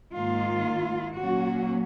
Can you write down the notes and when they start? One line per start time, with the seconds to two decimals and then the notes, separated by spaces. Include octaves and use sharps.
0.14 G#2 D#3 A#3 F4
1.17 A#2 F#3 A#3 C#4 F#4